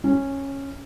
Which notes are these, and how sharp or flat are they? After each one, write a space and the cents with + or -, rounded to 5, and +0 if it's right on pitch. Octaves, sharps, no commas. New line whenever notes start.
C#4 -10